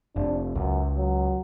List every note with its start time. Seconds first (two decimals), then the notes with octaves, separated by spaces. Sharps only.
0.16 F1 D4
0.55 C#2 F#2
0.97 F#3